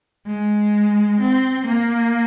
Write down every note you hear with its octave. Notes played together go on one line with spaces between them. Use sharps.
G#3
C4
A#3